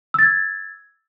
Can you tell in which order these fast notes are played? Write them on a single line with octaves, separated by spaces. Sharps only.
E6 A6 G#6